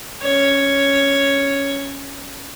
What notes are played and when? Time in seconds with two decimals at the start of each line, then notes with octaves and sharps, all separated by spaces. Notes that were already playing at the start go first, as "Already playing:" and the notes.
0.22 C#4 C#5